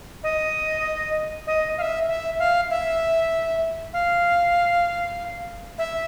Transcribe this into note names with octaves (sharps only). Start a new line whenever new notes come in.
D#5
D#5
F5
E5
E5
F5
E5
F5
E5